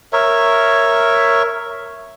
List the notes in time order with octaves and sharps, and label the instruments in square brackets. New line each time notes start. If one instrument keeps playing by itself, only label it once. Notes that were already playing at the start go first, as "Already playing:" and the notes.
[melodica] A#4 C#5 E5